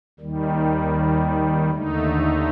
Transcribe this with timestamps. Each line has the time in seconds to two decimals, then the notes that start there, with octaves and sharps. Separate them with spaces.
0.20 D#2 D#3 G3
1.71 D#2 D3 A3 D#4